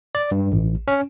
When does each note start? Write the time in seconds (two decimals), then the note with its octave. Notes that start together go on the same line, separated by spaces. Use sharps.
0.15 D5
0.31 G2
0.52 A1
0.88 C#4